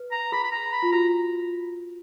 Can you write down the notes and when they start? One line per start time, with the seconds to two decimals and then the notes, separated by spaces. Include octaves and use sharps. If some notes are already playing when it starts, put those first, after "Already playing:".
Already playing: B4
0.12 A#5
0.32 G#4 B5
0.44 B5
0.52 A#5
0.72 B5
0.83 F4
0.92 F#4 A#5